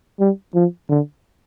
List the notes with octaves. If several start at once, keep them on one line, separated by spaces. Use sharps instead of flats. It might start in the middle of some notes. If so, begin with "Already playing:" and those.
G3
F3
D3